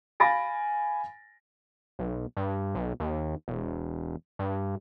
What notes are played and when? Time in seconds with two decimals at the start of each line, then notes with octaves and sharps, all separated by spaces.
0.20 F5 G#5 B5 A6 A#6 D7
1.99 B1
2.37 G2
2.75 B1
3.00 D#2
3.48 E1
4.39 G2